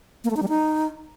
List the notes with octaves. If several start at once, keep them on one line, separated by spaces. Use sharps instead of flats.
A#3
A3
D#4
G3
D#4